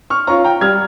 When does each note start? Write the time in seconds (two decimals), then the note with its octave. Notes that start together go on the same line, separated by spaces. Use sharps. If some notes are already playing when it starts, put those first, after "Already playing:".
0.10 C#6 F6
0.27 C#4 F4 A#5 C#6
0.44 G5 A#5
0.61 G3 F6 G#6